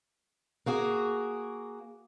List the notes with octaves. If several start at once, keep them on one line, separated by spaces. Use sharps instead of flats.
A#3 F#4 G#4